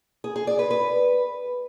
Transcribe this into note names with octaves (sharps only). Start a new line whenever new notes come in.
G#4
G#4
D5
B4
B4